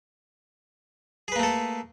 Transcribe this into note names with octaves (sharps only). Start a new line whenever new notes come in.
A3 A#3 G#4 A4 B4